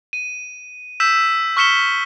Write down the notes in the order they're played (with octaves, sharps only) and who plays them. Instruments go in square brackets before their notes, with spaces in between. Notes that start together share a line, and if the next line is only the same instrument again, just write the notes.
[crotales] D#7
E6 G6 B6 E7
C#6 F6 B6 C#7 E7 G7